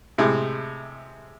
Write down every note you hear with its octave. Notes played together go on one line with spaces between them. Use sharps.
A2 C3 G#3